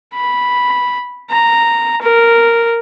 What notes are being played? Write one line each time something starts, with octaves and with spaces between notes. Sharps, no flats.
B5
A#5
A#4